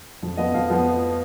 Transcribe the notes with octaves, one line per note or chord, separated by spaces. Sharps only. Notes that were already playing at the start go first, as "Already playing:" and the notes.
F2
F3 B3 D#5
F2 F5
F3 B3